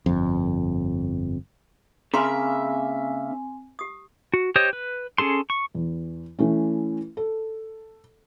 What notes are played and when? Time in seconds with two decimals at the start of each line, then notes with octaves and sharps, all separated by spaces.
0.06 G1 F2
2.14 C#3 A#3 C4 E5 G#5 A#5 C6
3.79 G4 D#6
4.34 F#4
4.56 G4 C5 C#5 D#5 D#6
4.73 B4
5.18 C#4 G#4 A4 C6
5.50 C#6
5.74 E2
6.39 E3 A3 C#4
7.17 A4